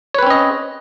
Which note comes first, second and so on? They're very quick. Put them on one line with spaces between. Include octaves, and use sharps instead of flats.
C#5 B4 C4 C#4 D#5